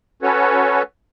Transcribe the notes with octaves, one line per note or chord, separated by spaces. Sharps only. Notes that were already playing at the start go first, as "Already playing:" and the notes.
C#4 F#4 A4 B4 C#5